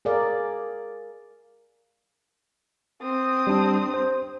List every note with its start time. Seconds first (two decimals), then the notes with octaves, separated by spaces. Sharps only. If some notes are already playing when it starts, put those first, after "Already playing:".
0.05 G#4 A#4 D5 F5
3.02 C4 D#6
3.47 G3 D4
3.94 C5